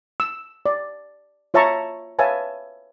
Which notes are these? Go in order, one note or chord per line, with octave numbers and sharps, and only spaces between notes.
E6
D5
F4 C#5 E5 A5 A#5 C#6
B4 C#5 E5 F5 G#5 A5